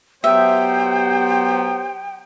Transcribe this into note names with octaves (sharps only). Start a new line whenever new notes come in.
B2 F#3 B3 G4 C5 E5 G5